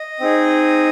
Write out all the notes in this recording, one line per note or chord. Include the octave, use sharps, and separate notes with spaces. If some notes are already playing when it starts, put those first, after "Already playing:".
Already playing: D#5
C4 D#4 G#4